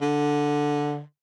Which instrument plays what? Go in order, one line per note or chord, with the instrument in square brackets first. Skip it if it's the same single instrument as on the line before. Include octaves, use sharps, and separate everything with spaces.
[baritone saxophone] D3